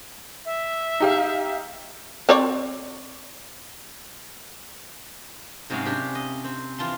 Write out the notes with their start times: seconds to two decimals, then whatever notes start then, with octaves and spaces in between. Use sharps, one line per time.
0.45 E5
1.00 D#4 G4 F5
2.29 C4 C#5 D5
5.70 G#2 C3 F#3 G#3 C#4 F5
5.85 C3 C#4 D4 G4
6.15 D#5
6.44 C4
6.79 E3 F4 A5 C6